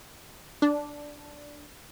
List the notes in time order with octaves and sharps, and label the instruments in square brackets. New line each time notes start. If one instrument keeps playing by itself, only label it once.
[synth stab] D4